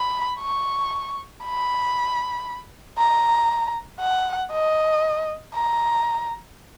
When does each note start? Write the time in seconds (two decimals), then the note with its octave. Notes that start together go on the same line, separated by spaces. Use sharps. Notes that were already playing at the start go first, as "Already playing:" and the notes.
Already playing: B5
0.41 C#6
1.44 B5
2.99 A#5
4.00 F#5
4.52 D#5
5.55 A#5